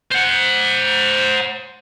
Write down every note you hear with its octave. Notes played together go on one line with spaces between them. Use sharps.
C5 F#5